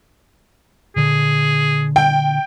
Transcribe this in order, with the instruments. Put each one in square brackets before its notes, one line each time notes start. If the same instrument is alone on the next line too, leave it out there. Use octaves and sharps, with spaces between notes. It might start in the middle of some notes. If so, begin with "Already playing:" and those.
[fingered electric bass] A#2 D3 [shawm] G#4
[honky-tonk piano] G5